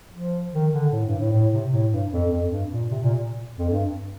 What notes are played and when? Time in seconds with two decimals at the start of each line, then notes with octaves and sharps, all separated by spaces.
0.14 F3
0.53 D#3
0.73 D3
0.92 A2
1.06 G2
1.19 A2
1.32 A2
1.53 C3
1.72 A2
1.92 G2
2.12 F2
2.31 F2
2.51 G2
2.71 A#2
2.91 C3
3.04 A#2
3.58 F2
3.70 G2